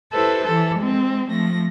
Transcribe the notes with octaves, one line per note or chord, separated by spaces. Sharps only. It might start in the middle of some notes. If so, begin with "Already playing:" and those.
E4 G4 A4 B4 C5
E3 A4
G#3 C4
F3 A3 A#6